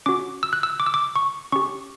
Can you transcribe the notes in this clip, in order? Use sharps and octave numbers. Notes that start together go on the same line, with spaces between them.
C#4 F#4 D6
E6
F#6
E6
D6
E6
D6
C#6
C#4 G4 C#6